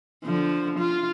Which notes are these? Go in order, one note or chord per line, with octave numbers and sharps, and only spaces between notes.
D3 F3
F4